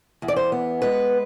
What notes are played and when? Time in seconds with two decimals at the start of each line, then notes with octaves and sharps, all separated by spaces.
0.22 E2
0.28 D5
0.36 C5
0.52 B3
0.82 G#3 B4